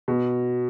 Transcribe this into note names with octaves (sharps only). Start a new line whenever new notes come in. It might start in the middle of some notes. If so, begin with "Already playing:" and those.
B2